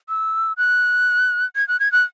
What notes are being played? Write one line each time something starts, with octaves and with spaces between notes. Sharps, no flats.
E6
F#6
G#6
F#6
G#6
F#6